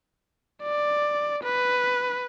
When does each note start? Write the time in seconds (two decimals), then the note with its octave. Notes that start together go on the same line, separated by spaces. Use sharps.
0.63 D5
1.43 B4